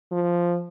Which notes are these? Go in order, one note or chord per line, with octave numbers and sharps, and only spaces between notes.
F3